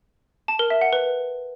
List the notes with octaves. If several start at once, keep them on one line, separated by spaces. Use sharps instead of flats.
A5
A#4
E5
F#5
B4